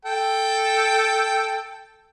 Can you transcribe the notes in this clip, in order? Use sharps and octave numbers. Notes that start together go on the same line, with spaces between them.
A4 G5